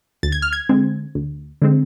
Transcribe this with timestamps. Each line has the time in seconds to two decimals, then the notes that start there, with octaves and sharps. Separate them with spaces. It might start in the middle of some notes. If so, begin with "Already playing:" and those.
0.23 D2 A6
0.32 G#6
0.42 F6
0.53 G#6
0.69 D3 G#3 C4
1.15 D2
1.62 D3 G#3 C4